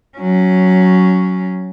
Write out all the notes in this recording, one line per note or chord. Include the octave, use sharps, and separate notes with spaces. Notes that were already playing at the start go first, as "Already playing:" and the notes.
F#3 C#4